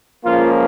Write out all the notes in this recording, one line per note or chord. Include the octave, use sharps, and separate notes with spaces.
C#2 C#3 F3 A#3 F4